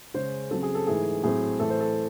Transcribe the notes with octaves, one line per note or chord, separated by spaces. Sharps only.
C#3 G#3 C#4 C5
C#3 F#3 C4 A4
G#4
A4
G#2 E3 A3 G#4
A2 F#3 A3 C4 G#4
A2 E3 A3 A4
C5
A4